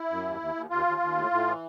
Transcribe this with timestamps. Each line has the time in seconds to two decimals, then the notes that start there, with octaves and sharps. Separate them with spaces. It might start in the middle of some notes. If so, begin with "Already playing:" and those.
Already playing: E4
0.10 F#2
0.25 D#2
0.40 D#2
0.55 D#2
0.70 D#2 F4
0.86 D#2
1.01 D#2
1.17 A2
1.31 A2
1.47 E3